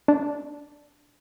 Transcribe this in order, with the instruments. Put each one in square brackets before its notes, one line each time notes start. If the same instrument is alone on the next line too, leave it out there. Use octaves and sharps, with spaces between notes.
[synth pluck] D4